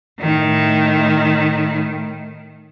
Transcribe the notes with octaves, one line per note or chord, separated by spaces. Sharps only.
A2 D#3